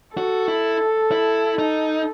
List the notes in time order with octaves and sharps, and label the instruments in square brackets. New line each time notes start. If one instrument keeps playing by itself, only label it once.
[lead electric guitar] F#4 [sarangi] A4
[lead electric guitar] E4
E4
D#4